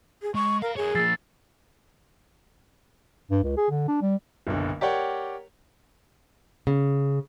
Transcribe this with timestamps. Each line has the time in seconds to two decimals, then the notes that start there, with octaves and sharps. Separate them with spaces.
0.22 G#4
0.35 G#3 C#6
0.62 A4 A#4 F5
0.76 G#4 A#4 C#5
0.95 F3 A#3 E6 A6 C7
3.31 G2
3.43 C#2
3.57 G#4
3.71 D3
3.88 D4
4.01 G3
4.47 F#1 B1 D3
4.81 G4 A#4 C#5 D5 F#5 G5
6.67 C#3